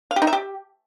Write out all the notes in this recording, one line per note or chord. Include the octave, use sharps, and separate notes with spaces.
F5
G4
D#4
E5
G4